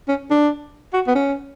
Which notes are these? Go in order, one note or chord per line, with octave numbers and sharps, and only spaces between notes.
C#4
D4
F#4
B3
C#4